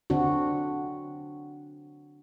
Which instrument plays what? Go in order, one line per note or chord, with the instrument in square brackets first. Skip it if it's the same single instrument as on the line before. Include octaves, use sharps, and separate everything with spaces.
[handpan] D3 C4 D4 F#4